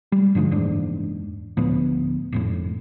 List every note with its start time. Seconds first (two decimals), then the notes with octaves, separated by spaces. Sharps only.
0.12 G3
0.35 G2 D3 F3 G#3
0.51 F#1 E2 G#2 D4
1.57 D2 A2 F3 B3
2.32 G#1 F2 A2